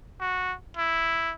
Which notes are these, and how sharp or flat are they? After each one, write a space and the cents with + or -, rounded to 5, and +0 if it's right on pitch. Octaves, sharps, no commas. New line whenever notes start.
F#4 -10
E4 +0